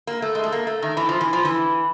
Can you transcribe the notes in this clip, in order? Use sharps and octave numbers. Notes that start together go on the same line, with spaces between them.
A#3
A3
G#3
A3
A#3
A3
D#3
E3
F3
E3
F3
E3